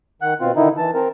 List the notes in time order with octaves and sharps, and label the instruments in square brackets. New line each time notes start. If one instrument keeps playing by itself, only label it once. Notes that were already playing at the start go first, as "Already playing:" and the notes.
[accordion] D#3 F#5 F#6
B2 C4 F4
D3 D#3 D#4 E4
E3 A5
C4 A#4